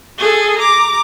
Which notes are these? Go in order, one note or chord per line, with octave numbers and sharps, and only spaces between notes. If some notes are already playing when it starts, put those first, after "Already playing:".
G#4 A4
A#5 D6